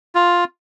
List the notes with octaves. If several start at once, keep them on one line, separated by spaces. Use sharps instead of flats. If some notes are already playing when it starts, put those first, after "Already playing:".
F4